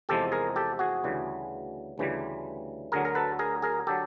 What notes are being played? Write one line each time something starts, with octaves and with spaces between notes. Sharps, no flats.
E2 C3 F3 G#3 G4 A4
G#4 A#4
G4 A4
F#4 G#4
D2 C#3 E3 G3
D2 C#3 E3 G3
D2 D3 F#3 G#4 A#4
A#4
A4 B4
G#4 A#4
G#4 A#4
D3 F#3 G4 A4